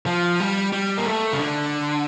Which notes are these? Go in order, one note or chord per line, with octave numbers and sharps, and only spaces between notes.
F3
G3
G3
A#3
A3
C#3
D3